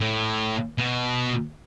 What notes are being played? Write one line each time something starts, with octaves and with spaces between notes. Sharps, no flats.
A2
B2